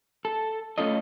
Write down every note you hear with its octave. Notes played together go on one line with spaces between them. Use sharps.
A4
A3 C#4 F4 A4 D#5